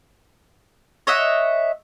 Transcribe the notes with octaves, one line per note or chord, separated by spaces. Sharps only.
C#5 D#5 E5 F#5